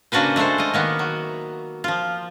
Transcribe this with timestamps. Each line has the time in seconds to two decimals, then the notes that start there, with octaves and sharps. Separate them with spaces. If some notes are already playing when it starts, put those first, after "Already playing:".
0.12 C#3 A#3 D4 F#4 B4 C5
0.36 G#3 A3 D4 A4 C5
0.58 F4 D#5
0.74 D#3 A#3 B3
0.99 F#3
1.84 F3 F4